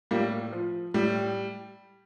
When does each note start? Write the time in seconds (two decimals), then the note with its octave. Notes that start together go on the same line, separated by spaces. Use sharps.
0.11 A2 G3 A#3
0.52 F3
0.94 A2 G3